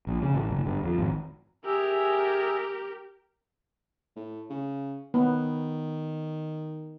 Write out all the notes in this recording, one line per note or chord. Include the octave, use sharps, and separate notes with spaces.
A#1
C#3
A1
F#1
G1
F2
G#1
G4 G#4 A#4 E5
A2
C#3
D#3 B3